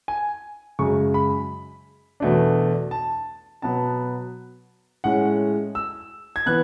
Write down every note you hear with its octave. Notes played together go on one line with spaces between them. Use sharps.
G#5
F#2 C#3 G#3 C#6
B5
E2 B2 A3 D4
A5
B2 F#3 B3 A5
A2 G#3 C#4 F#5
E6
G#6
E3 B3 F#6